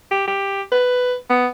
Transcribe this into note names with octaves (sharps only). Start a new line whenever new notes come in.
G4
G4
B4
B3